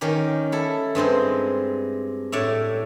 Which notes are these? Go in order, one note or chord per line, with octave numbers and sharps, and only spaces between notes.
D#3 C#4 G4
E4 A4
G2 G#3 C4 C5
A2 C#5 D5 E5